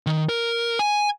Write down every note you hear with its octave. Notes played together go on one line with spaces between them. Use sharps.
D#3
A#4
G#5